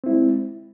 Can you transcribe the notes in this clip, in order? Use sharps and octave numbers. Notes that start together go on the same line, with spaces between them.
G#3 C4 E4